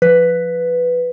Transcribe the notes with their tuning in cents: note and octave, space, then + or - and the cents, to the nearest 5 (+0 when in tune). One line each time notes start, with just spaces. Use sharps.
F3 +5 B4 +5